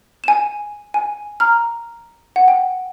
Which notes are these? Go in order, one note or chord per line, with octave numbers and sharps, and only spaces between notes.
G#5 E7
G#5
A#5 F6
F#5
G5